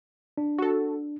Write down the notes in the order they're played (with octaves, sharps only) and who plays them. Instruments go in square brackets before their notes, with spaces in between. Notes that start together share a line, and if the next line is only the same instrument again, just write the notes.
[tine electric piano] D4
[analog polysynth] F#4 A4